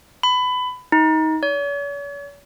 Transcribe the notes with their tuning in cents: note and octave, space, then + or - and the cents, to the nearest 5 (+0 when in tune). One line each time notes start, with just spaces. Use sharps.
B5 +20
D#4 +20
C#5 +45